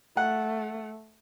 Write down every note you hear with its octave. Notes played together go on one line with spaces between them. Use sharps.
A3 F#5